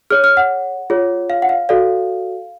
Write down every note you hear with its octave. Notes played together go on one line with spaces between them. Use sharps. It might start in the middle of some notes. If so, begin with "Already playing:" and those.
G#4 C#5 F6
F6
F#5
F4 G#4 C#5
F5
F#5
F5
F#4 A4 D5 F5